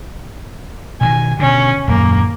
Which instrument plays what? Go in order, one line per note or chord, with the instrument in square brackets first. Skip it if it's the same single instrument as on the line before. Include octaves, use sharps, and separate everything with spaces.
[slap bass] B2 D3 D#3 [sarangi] G#5
[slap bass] B2 D3 [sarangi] C#4
[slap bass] D#1 F#2 [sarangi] A#3